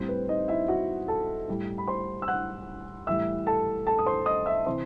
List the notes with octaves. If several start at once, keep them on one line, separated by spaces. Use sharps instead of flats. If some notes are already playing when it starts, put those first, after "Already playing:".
Already playing: A2 G3 C4 C5
B4
D#4 D#5
E4 E5
F#4 F#5
A4 A5
A2 G3
B5
C5 C6
E6
F#5 F#6
A2 E3 G3 E5 E6
A4 A5
A4 A5
D#6
C5 C6
D#5 D#6
E5 E6
C3 E3 C5 C6